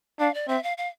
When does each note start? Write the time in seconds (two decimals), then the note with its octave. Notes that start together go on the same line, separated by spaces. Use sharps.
0.20 D4 F5
0.34 D5
0.48 C4 E5
0.63 F5
0.78 F5